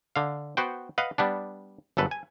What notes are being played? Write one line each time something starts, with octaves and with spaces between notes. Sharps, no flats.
D3 F5
B3 F#4 C5 G5
B4 D#5 F5 F#5
G3 B3 D4
G1 F#2 A4 B4
G#5